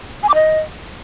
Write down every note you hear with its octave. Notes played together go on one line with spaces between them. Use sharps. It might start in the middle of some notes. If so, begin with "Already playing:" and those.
G#5
D6
D#5